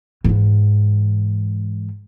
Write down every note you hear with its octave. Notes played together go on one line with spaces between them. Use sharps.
G#2 E3